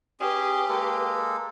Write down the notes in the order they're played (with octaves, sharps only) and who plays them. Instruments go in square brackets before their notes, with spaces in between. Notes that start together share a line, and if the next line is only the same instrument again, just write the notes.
[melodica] C#4 G#4 [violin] G4 B4
[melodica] G#3 A#3 A4